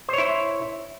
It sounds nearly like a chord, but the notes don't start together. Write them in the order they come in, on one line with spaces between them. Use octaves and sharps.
C5 C#5 E4